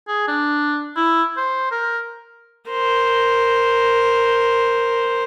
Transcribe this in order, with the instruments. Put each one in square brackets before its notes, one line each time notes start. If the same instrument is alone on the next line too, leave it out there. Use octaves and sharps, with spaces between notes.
[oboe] G#4
D4
E4
C5
A#4
[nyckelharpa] A#4 C5